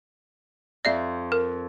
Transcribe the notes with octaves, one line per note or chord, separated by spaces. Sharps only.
F2 D5 E5 G6
A#4